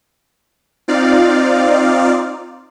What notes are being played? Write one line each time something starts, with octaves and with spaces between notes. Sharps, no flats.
C4 D#4 F4 D5 F5